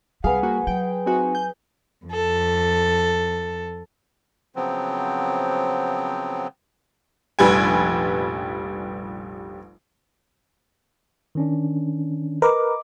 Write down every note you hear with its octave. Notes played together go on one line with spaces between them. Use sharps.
C2 G3 G#4 B4 F5 F#5
A#3 F#4
F#3 G5
C4 D#4 F#4 G#5
G6
F2 A4
C#3 F3 F#3 B3 C4
F1 A#1 G3 B4 G#5
D#3 C#4 D4
A#4 B4 D#5 D6